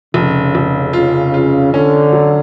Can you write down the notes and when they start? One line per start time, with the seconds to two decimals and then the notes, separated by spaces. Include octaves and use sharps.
0.14 F1 C#3
0.55 F1
0.93 C#3 F4
1.34 F4
1.73 D3 C#4
2.12 F#3